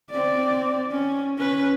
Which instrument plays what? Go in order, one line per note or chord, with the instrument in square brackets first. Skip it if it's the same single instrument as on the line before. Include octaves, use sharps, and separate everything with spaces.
[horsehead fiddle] C4 D5
C#4
C#4 B4